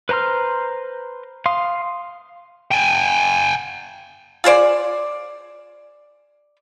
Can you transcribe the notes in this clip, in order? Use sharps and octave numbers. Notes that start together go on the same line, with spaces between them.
B4 C5 A#5 C6 F6
F5 C6 D#6
G5 G#5
F4 G#4 C5 D5